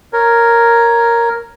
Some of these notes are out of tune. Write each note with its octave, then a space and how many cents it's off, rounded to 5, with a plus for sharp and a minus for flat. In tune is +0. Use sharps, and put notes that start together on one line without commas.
A#4 +0 C#5 +0